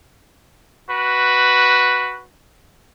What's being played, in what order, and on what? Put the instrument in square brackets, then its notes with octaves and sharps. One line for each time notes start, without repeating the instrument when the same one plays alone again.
[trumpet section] F#4 B4